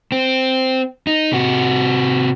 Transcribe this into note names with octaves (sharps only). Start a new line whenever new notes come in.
C4
D#4
C3 F#4